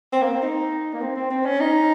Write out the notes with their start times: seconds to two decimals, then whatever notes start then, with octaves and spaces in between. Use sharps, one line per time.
0.12 C4
0.22 A#3
0.31 C4
0.42 D#4
0.94 A#3
1.01 C4
1.16 C4
1.30 C4
1.45 C#4
1.60 D#4